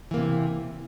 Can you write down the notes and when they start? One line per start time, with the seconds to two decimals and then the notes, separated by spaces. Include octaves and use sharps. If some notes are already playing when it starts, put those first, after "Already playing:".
0.11 E3
0.14 A#3
0.17 C3